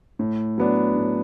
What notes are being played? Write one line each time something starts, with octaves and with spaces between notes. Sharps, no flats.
A2
F#3 B3 D4
A2